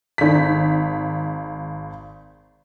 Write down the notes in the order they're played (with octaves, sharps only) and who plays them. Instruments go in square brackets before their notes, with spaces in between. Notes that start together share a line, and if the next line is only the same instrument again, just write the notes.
[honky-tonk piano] G#1 B6